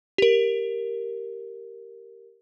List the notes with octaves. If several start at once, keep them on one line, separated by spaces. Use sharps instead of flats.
G4 A#4